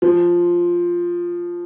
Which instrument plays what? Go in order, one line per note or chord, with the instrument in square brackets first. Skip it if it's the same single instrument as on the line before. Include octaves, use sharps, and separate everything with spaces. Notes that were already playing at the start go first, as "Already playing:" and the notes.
[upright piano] F3